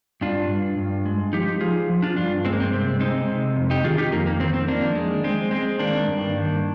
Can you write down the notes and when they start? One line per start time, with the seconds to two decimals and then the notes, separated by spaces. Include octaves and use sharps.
0.21 G2 D4 F4
0.49 G2
0.77 G2
1.06 G#3
1.33 F3 D#4 G4
1.61 F3 F4 G#4
1.90 F3
2.02 D4 F4
2.16 G2 D4 F4
2.45 G#3 C4
2.53 A#3
2.60 C4
2.72 C3 C4
3.00 G#3 C4 D#4
3.28 C3
3.56 F2
3.70 D#4 G4
3.84 D#3 F4 G#4
3.98 D#4 G4
4.12 F2 A#3
4.26 A#3
4.40 D#3 C4
4.54 C4
4.68 F3 A#3 D4
4.95 G#3
5.24 G#3 C4
5.51 G#3 C4
5.79 D#3 A#3 D4
6.08 G2
6.36 D#3